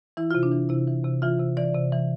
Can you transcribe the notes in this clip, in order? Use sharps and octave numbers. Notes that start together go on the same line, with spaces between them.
E3 E4
C3 F4
D4
E3
C3 E4
E3
C3
E3 F4
C3
E3 D5
C3
E3